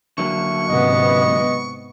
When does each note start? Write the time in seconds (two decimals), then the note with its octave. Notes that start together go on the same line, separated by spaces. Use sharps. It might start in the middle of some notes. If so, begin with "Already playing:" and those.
0.18 D3 F#3 A#3 E5 C#6
0.68 G#2 C3 B3 D#5